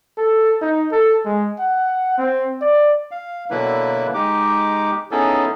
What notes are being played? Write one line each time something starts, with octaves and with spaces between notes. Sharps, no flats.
A4
D#4
A4
G#3
F#5
C4
D5
F5
B2 D3 F#3 A#3 E4 B4
G#3 D#4 G4 D6
B3 C#4 D#4 E4 G#4 A4